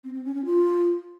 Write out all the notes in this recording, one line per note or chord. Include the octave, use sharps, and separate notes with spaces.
C4
C4
C#4
C#4
F4